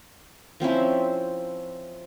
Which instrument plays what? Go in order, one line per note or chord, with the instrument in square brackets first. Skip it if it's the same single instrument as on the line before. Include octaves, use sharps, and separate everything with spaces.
[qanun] F3 C4 C#4 E4